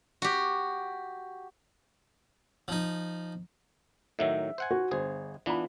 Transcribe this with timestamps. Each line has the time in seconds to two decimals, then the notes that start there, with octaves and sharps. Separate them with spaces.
0.22 F#4 G4
2.68 F3 D#4
4.19 A2 D#3 F#3 E5
4.58 C5 F#5 G#5
4.71 F#4
4.91 G1 G#4 C5
5.46 E3 B3 D4 F4 B5